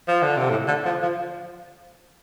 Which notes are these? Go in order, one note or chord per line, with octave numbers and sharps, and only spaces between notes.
F3
D3
C3
A2
D3
F3
F3